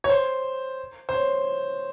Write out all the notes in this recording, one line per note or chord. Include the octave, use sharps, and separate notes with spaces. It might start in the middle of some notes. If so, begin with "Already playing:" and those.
C#5
C5
C5
C#5